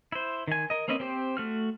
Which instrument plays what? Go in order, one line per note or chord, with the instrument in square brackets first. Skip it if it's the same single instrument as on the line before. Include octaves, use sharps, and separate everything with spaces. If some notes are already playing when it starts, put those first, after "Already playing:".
[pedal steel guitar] E4 C5
D#3 G#5
A#4 D#5
A#3 C4 C#4 B4 D#5
C4 G4 C5
A3 F#4 F6